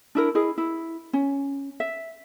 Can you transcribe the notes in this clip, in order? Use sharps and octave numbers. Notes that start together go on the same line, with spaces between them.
D4 E4 A#4
E4 G#4 D#5
E4
C#4
E5